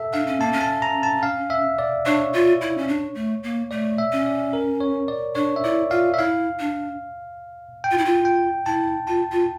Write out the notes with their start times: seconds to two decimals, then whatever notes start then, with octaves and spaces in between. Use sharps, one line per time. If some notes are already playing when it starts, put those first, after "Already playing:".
Already playing: A4 E5
0.13 D4 F5
0.27 C#4
0.40 A#3 A5
0.53 C#4
0.61 A5
0.82 A#5
1.03 A5
1.23 F5
1.50 E5
1.79 D5
2.06 D4 C#5
2.33 F4
2.61 E4
2.78 C#4
2.88 D4
3.15 A3
3.43 A#3
3.71 A3 D5
3.98 E5
4.12 C#4
4.26 D5
4.53 A#4
4.80 C#5
5.08 D5
5.35 D4 C#5
5.56 E5
5.64 E4 D5
5.90 F4 F5
6.14 E5
6.18 E4 F5
6.60 D4
7.84 G5
7.91 F4
7.98 E4
8.05 F4
8.25 G5
8.66 E4 A5
9.07 F4 A5
9.32 F4